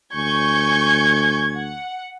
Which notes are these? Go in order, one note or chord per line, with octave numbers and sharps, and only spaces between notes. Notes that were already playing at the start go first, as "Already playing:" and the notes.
D2 G#5 C#6 G6 G#6
F#5